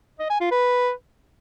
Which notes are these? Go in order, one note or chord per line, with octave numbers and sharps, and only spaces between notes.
D#5
G#5
F4
B4